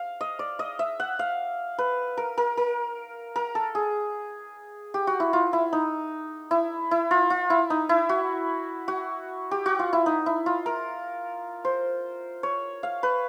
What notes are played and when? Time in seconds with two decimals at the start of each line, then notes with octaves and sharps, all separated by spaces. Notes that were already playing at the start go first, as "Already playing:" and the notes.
Already playing: F5
0.21 D#5
0.39 D5
0.59 D#5
0.79 E5
1.00 F#5
1.19 F5
1.79 B4
2.17 A#4
2.38 A#4
2.57 A#4
3.36 A#4
3.55 A4
3.75 G#4
4.94 G4
5.07 F#4
5.20 E4
5.33 F4
5.53 E4
5.73 D#4
6.51 E4
6.91 E4
7.11 F4
7.30 F4
7.50 E4
7.70 D#4
7.89 E4
8.09 F#4
8.88 F#4
9.51 G4
9.66 F#4
9.79 F4
9.93 E4
10.06 D#4
10.26 E4
10.46 F4
10.66 A#4
11.65 C5
12.43 C#5
12.83 F5
13.03 B4